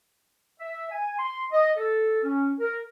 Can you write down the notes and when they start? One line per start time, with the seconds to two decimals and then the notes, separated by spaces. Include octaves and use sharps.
0.60 E5
0.91 G#5
1.18 C6
1.52 D#5
1.76 A4
2.23 C#4
2.59 A#4